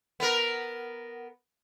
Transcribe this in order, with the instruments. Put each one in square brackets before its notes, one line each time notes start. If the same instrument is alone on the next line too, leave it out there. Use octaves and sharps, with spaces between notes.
[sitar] B3 A#4